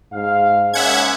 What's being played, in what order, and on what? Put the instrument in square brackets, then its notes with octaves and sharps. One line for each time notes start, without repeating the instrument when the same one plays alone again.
[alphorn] G#2 [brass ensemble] F5
[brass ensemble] G#3 A#3 C#4 [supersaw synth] E5 F#5 G#6